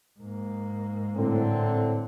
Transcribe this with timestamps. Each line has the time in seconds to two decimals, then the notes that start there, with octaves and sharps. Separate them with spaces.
0.19 G#2 A#3
1.17 A2 D3 C4